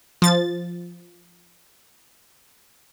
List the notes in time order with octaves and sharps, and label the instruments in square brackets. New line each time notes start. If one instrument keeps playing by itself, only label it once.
[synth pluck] F3 A6